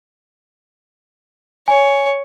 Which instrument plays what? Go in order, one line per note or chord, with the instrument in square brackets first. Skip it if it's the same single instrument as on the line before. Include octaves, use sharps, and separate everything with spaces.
[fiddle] C#5 [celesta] G#5